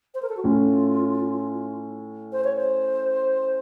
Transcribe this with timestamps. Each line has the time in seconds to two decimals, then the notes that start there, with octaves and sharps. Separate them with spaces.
0.14 C5
0.22 A#4
0.29 A4
0.37 F#4
0.44 A2 A3 C#4 F4
2.33 C5
2.44 C#5
2.57 C5